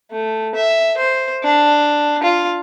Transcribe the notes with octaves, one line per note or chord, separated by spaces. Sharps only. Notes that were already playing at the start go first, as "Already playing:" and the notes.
A3
E5
C5
D4
F4